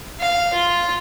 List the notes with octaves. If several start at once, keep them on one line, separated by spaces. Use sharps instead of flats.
F5
F4